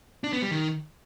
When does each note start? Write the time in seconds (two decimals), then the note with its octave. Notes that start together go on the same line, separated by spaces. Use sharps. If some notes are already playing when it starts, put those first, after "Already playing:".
0.24 D4
0.33 B3
0.42 G3
0.51 D#3